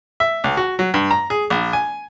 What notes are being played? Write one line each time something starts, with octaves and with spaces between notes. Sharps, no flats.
E5
C#2
F#4
F#3
G2
A#5
G#4
A#1
G#5